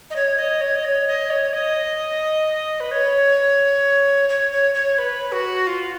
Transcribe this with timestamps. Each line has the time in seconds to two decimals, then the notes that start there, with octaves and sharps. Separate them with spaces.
0.10 D#5
0.16 C#5
0.38 D#5
0.61 C#5
0.76 D#5
0.85 C#5
1.07 D#5
1.30 C#5
1.53 D#5
2.80 B4
2.91 C#5
4.29 C#5
4.52 C#5
4.74 C#5
4.98 B4
5.32 F#4
5.67 F4